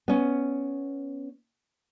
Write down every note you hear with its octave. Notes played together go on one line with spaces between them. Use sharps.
B3 C#4